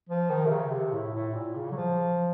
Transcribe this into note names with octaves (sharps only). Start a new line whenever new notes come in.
F3
D#3
C3
C#3
C3
A2
A2
A#2
C#3
F#3
F3